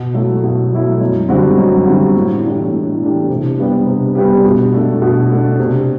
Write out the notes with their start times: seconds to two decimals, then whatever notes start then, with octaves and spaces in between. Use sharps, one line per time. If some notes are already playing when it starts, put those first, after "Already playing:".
Already playing: B2
0.14 F#3 A3 E4
0.43 B2
0.72 F#3 A3 E4
1.01 F#2
1.29 D3 G3 C4 F#4
1.58 F#2
1.86 D3 G3 C4 F#4
2.16 A2
2.44 E3 A3 D4 G4
2.73 A2
3.01 E3 A3 D4 G4
3.29 C3
3.59 G3 B3 D4 G4
3.87 C3
4.15 G3 B3 D4 G4
4.45 B2
4.73 A3 D4
5.02 B2
5.29 A3 D4
5.59 C3